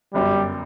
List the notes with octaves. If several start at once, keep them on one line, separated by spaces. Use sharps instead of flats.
G1 F#2 F#3 G3